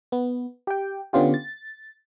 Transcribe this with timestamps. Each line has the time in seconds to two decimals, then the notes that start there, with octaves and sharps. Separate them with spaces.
0.12 B3
0.67 G4 G5
1.13 D3 B3 C#4 F4 G4
1.34 A6